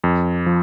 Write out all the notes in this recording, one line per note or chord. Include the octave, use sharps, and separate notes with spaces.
F2
F3